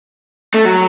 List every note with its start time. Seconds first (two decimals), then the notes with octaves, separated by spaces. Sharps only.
0.54 A3
0.65 F#3